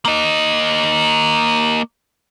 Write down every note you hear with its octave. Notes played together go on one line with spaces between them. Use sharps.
A#3 D#5